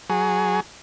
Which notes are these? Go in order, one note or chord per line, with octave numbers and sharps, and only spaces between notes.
F#3 G#4